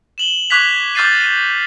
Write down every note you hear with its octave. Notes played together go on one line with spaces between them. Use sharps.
E7 F#7 G7
C#6 D6 F#6 G#6 B6 F7
D6 F6 G6 A6 C7 D#7
D#7